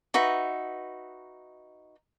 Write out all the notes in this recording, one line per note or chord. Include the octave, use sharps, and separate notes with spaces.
D#4 F#4 B4 E5